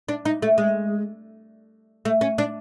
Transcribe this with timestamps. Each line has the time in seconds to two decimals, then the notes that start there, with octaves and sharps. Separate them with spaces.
0.08 D4
0.25 D#4
0.42 A3
0.58 G#3
2.05 A3
2.21 C#4
2.38 D4